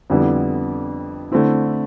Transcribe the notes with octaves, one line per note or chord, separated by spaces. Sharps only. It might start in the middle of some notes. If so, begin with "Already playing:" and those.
F2 D3 G3 B3 E4
D3 A3 C4 E4